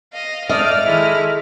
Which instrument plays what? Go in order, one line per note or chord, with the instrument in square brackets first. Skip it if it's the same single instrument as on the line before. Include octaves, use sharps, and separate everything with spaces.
[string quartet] D#5 F5
[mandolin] A3 [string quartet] D5 [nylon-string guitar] D#5 [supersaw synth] F6
[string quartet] D#3 G#3 E4